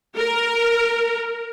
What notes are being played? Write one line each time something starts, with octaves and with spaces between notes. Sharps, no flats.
A#4